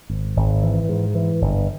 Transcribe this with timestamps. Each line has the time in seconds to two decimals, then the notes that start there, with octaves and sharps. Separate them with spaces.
0.10 G#1
0.36 G#1
0.63 E3
0.89 G#2
1.15 E3
1.41 G1